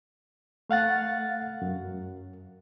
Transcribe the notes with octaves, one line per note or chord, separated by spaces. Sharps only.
A3 F5 F#5 A6
F#2